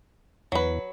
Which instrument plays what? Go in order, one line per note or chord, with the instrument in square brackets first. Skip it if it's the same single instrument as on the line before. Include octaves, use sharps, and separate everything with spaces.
[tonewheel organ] E2 [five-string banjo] F#3 B4